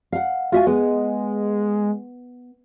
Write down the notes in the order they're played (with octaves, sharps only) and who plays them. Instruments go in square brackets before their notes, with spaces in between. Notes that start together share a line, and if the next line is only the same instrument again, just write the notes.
[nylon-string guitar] F5 F#5
[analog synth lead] F4 [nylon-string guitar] F#4 E5 G#5
[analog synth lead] G#3 [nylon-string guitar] B3